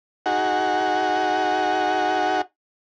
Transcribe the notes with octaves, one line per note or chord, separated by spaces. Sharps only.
D#4 F#4 G#4 F#5